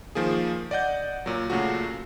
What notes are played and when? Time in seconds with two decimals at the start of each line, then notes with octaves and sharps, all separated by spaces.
0.15 D#3 F3 A#3 G#4
0.71 D5 D#5 F#5 G6
1.26 A#2 F#3
1.50 A#2 C#3 F#3 A3 F#4